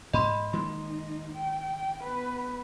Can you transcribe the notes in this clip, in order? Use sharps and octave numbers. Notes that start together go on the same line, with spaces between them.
G#2 D#5 B5 C6
D#3 G#3 A#3 D#4 C6
G5
B3 B4